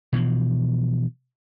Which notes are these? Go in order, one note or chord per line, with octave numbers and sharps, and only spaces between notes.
B2 E3 F3